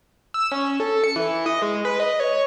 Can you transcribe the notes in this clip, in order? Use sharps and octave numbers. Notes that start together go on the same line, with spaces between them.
E6
C#4
A4
C#7
E3
D#5
G#3
B4
D#5
C#5